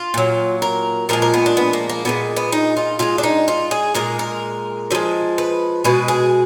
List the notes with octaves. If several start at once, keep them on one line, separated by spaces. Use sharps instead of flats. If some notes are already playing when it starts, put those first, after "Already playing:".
Already playing: F4
A#2 F#3
A#4
A#2 F3 G#3 A#4
A#4
B3
D4
B3
A#3
A#3
A#2 F3 G#3 B3
B3
D#4
F4
D3 G#3 F4
D4
D#4
F4
G#4
A#2 G#3 A#4
A#4
D3 F3 G#3
B4
B2 G#3 B4
G#4